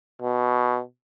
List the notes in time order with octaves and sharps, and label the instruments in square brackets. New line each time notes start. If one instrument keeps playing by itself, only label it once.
[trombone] B2